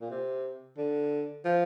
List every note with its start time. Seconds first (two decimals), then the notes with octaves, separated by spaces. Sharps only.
0.01 A#2
0.11 C3
0.78 D3
1.44 F3